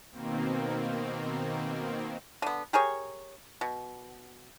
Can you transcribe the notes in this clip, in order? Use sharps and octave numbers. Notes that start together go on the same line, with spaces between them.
B2 D#3 A#3 C4
D3 B3
G4 G#4 A#4 C#5
B2